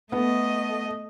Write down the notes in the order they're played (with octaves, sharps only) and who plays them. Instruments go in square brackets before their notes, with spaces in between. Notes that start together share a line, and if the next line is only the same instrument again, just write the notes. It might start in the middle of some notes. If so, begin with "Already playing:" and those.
[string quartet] A3 D#5 [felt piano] B3